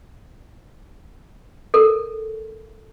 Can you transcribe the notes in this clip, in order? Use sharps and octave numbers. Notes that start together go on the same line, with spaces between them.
A4 A#4